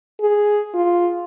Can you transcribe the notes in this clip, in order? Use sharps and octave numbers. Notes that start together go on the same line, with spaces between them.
G#4
F4